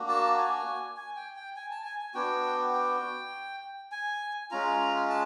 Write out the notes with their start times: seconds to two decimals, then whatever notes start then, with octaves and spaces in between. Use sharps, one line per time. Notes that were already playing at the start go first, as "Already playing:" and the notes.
Already playing: A#3 D4 F#4
0.09 A5
0.38 G#5
0.97 G#5
1.16 G5
1.36 G5
1.56 G#5
1.71 A5
1.85 G#5
2.01 G#5
2.14 B3 D4 F#4 G5
2.73 G5
3.92 G#5
4.51 G#3 C#4 F4 A#5
5.09 A5